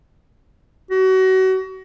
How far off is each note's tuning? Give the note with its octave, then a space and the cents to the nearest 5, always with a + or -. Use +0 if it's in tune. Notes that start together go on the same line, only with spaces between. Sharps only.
F#4 +30